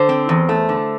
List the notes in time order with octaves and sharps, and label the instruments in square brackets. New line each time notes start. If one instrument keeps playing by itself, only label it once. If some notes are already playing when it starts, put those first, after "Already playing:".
Already playing: [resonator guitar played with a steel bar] D3 C5
C4
E2
A3
D3